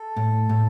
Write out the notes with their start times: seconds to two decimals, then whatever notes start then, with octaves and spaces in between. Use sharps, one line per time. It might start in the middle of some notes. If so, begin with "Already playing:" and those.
Already playing: A4
0.16 A2
0.49 A2